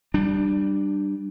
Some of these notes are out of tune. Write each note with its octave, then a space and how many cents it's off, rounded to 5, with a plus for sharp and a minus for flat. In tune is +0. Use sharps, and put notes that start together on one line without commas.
G3 -10 D4 +20